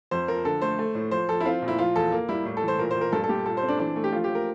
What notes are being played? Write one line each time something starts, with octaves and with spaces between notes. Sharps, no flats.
F2 C5
F3 A#4
D3 A4
A3 C5
A3
A2
F3 C5
F3 A4
E4
C4 F4
A#2
E4
F3 F4
E2 A4
A#3
G3 E4
A2
A4
E3
C5
A#2 A#4
A#2 C5
A#4
G2 A4
A4
G2 G4
A#2 A4
C5
C4
D4
E3 D4
A3
G4
F3 F4
G4
F3
A#4